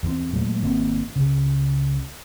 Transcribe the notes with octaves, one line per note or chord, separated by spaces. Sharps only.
E2 E3 F3 C4
A#2 F#3 G#3 A3
G#1 D#3 A#3 C4
C#2 C#3